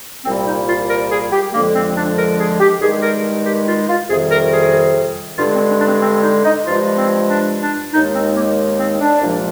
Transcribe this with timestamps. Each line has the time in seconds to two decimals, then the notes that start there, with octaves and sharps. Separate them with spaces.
0.25 C2 A#2 G3 C4
0.47 D#4
0.68 F4
0.89 A#4
1.11 G#4
1.32 G4
1.53 F2 D3 F3 G#3 A#3
1.75 C4
1.96 D4
2.18 A#4
2.39 G#4
2.60 G4
2.81 G2 D#3 G#3 G#4
3.02 A#4
3.45 G4
3.67 F4
3.89 F4
4.09 F2 C3 D#3 G3 G#4
4.31 A#4
4.52 G#4
5.38 G2 D3 G#3 F4
5.54 C4
5.70 D4
5.81 D4
5.85 C4
6.02 C4
6.23 D#4
6.44 D#4
6.65 G2 F3 G#3 F4
6.97 C4
7.29 D4
7.62 D4
7.93 D#2 D#3 G#3 D#4
8.15 C4
8.35 A#3
8.79 C4
9.00 D4
9.21 C2 A#2 F3 G#3